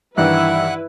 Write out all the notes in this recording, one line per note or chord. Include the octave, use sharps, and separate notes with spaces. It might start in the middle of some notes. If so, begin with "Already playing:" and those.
G2 D#3 E3 E4 B4 E5 F#5 F#6